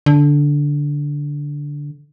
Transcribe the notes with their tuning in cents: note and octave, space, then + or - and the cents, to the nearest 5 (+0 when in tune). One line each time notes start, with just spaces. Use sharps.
D3 -10